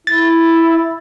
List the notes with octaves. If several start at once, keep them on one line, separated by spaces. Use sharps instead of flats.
E4 A6